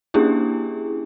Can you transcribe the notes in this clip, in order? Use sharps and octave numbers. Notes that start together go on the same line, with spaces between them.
A#3 C#4 D4 E4 G4 G#4